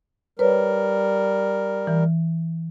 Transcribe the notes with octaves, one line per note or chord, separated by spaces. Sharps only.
G3 A#4 B4 C#5
E3